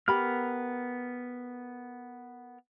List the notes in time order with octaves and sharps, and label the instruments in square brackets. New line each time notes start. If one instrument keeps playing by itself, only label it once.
[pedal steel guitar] B3 A#4 F6 [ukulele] G4 B5